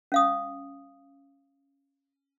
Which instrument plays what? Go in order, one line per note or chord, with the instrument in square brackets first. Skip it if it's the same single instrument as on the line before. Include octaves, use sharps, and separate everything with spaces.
[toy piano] C#4 F5 D#6